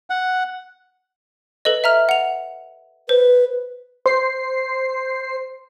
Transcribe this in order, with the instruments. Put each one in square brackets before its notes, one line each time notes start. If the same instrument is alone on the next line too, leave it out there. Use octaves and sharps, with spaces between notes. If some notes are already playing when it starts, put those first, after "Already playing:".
[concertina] F#5
[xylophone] A4 B4 D#5
E5 A#5 F6
F#5 F7
[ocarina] B4 [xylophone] C5
[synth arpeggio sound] C5 C7